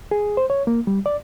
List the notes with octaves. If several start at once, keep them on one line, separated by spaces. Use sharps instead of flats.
G#4
C5
C#5
A#3
G3
D5